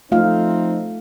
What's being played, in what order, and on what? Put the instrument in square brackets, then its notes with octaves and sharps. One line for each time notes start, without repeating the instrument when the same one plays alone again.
[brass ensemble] F3 C4 D#4 [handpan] A3 F4 F5